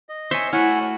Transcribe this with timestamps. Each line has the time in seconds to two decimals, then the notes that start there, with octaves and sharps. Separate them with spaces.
0.09 D#5
0.31 C5 C#5 E5 G#5
0.53 A3 E4 F#4 C#5 F#5 G#5 F6